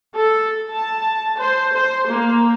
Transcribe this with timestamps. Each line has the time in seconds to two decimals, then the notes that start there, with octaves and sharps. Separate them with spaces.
0.17 A4
0.70 A5
1.36 C5
1.72 C5
2.06 A#3